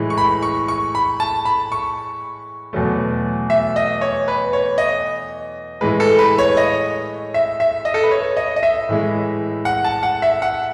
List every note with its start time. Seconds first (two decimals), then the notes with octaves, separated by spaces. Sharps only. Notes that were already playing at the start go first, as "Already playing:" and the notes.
Already playing: A2 E3 G#3
0.10 C#6
0.18 B5
0.42 C#6
0.68 C#6
0.95 B5
1.20 A5
1.45 B5
1.72 C#6
2.73 E2 B2 F#3 A3
3.50 E5
3.76 D#5
4.01 C#5
4.28 B4
4.53 C#5
4.78 D#5
5.81 A2 E3 G#3 B4
6.00 A4
6.19 B4
6.38 C#5
6.57 D#5
7.34 E5
7.60 E5
7.85 D#5
7.94 A4
8.03 B4
8.11 C#5
8.37 D#5
8.56 D#5
8.63 E5
8.89 A2 E3 G#3
9.65 F#5
9.84 A5
10.03 F#5
10.22 E5
10.42 F#5